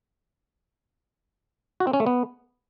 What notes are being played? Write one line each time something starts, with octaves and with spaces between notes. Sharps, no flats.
F#4
C4
C#4
A3
B3